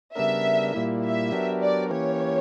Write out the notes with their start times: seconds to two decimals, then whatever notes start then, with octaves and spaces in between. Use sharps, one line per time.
0.15 C#3 G3 B3 D4 A#4 E5
0.74 A#2 G3 A#3 E4
1.04 E5
1.32 F#3 B3 D4 G4 A#4
1.62 D5
1.90 E3 A#3 C#4 G4 C#5